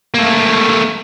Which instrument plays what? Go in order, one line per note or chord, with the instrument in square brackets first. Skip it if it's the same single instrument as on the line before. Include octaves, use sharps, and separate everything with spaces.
[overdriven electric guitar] A3 A#3